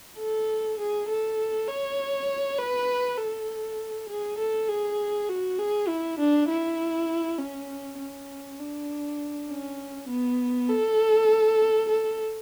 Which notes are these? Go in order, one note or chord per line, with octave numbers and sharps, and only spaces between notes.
A4
G#4
A4
C#5
B4
A4
G#4
A4
G#4
F#4
G#4
E4
D4
E4
C#4
C#4
D4
C#4
B3
A4
A4